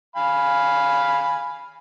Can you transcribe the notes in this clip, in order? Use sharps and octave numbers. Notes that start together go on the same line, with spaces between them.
F5 G#5 B5